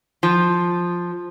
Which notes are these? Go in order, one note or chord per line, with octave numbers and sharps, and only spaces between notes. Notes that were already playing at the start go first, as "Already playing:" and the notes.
F3